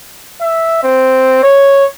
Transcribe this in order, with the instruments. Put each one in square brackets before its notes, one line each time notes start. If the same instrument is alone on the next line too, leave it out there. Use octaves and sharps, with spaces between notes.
[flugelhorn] E5
C4
C#5